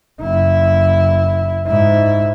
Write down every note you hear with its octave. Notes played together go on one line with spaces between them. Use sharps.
F#1 E4
G#2 E4